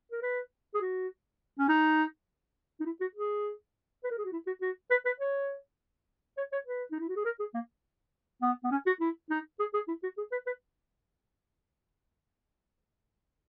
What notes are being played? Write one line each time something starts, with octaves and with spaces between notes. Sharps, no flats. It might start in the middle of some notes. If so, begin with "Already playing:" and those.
A#4
B4
G#4
F#4
C#4
D#4
D#4
E4
F#4
G#4
B4
A#4
G#4
F#4
E4
F#4
F#4
B4
B4
C#5
C#5
C#5
B4
D#4
E4
F#4
G#4
A#4
G#4
A#3
B3
B3
C#4
F#4
E4
D#4
G#4
G#4
E4
F#4
G#4
B4
B4